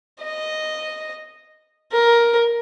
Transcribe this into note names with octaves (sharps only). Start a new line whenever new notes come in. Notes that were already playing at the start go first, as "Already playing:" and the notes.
D#5
A#4